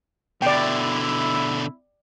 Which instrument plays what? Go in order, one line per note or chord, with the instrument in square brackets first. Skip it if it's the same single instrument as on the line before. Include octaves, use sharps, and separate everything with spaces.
[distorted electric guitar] B2 D3 [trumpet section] E4 [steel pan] D5 G5